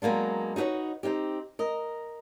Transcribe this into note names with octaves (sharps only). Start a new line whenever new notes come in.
F#3 G#3 A#3 B3 D4
D#4 F#4 G#4 B4 C#5
C4 C#4 D#4 G4
A#4 D#5